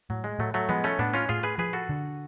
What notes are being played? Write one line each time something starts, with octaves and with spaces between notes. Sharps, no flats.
A2 F#3
G#3
A2 F#3 A3
F#3 A3
F3 G#3 B3
A3 C#4
A2 B3 D4
C#4 F4
A2 F4 G#4
G#4 B4
F3 G#4 B4
F#4 A4
D3